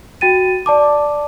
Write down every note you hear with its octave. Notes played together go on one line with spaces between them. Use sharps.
F#4 G5 A6 D#7
D5 A5 D6